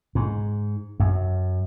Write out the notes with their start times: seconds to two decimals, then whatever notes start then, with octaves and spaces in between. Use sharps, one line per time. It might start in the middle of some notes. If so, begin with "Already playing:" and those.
0.15 G#2
1.00 F#2